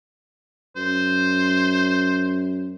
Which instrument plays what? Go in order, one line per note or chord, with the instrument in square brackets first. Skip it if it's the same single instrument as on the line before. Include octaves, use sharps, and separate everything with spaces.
[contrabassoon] F#2 [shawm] C5